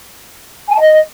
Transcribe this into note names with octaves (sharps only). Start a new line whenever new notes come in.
G#5
A5
D#5